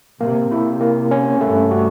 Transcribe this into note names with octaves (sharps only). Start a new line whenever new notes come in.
C3 A#3
C3 E4
A#3
C#4
G2 A3
F#4